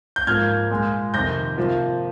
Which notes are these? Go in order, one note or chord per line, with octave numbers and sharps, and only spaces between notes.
G6
G#2 F3 A#3 F6 G#6
A#2 G#3
F2 C3 D#3 G6 A#6
C3 F3 A#3